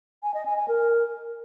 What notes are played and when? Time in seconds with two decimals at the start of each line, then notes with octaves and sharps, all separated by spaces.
0.23 G#5
0.34 D#5
0.46 G#5
0.57 G#5
0.68 A#4